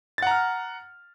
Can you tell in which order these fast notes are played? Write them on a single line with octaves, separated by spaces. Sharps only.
A6 F#5 A#5 F6